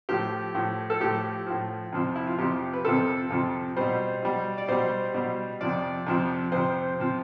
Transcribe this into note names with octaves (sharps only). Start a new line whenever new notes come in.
A2 F3 G4
A2 F3
A4
A2 F3 G4
A2 F3
F2 C3 F3
E4
F4
F2 C3 F3 G4
B4
F2 C3 F3 A4
F2 C3 F3
B2 G3 C5
B2 G3
D5
B2 G3 C5
B2 G3
F2 C3 F3 D5
F2 C3 F3
F2 C3 F3 C5
C3 F3